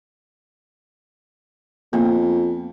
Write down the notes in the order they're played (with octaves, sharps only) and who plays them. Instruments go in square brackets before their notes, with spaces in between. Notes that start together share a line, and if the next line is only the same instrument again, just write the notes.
[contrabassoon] F2 [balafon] A#3 B3